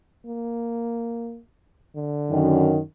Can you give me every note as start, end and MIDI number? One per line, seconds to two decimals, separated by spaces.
0.26 1.39 58
1.96 2.71 50
2.31 2.78 42
2.31 2.78 51